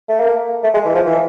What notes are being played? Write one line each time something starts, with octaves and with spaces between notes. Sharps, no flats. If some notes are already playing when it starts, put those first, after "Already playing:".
A3
A#3
A3
G#3
E3
F3
E3